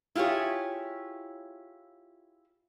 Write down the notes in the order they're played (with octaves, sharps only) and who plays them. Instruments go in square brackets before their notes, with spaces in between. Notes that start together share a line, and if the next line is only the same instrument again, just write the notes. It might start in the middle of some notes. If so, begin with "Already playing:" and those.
[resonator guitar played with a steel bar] E4 F4 G4 G#4 C#5